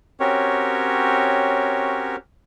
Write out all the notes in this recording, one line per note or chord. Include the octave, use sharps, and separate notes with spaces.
C4 C#4 F#4 G4 A#4 C#5